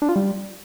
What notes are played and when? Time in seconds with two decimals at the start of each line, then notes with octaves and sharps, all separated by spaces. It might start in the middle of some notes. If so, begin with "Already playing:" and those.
0.02 D4
0.09 F4
0.16 G3